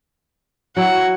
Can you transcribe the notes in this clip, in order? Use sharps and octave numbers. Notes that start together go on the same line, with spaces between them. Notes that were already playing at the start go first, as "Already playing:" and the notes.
F#3 E4 F#5